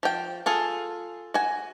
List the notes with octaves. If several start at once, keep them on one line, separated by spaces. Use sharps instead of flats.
F3 G5
F4 G#4 A4
F#4 G#5